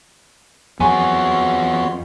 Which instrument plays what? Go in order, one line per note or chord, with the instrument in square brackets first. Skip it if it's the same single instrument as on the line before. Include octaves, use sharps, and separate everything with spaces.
[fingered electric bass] F2 F#3 [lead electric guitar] B3 G#4 [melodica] F#4 C#5 C6 [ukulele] G#5